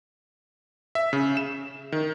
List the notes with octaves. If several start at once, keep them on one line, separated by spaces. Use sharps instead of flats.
E5
C#3
E7
D#3